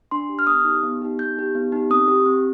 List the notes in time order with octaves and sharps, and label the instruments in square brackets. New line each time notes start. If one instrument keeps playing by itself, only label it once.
[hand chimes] D4 C6
G4
F6
B3 D#6
D#4 G4
B3
D#4 G4
B3 G6
D#4 G4
B3
D#4 G4
C4 D#6
G4
C4